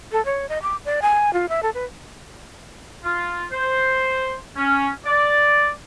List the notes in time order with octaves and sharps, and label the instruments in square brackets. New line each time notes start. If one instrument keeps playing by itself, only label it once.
[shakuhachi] A4
C#5
D#5
D6
D5
G#5
F4
E5
A4
B4
[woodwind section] F4
C5
C#4
D5